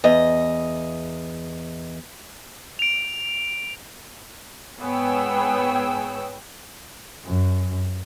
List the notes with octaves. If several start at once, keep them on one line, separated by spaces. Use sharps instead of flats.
E2 D#5
D7 F7
G#2 B3 G#4 C#5 G5 E6
F#2